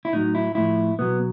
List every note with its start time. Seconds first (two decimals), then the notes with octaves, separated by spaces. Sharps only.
0.05 E4
0.13 A2 F#3 D#4
0.35 E4
0.55 A2 F3 E4
0.99 B2 F#3 B3